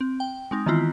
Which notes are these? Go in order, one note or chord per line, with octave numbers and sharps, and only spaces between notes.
C4
G5
G#3 C4 D#4
D#3 E3 B3 C4 E4 F4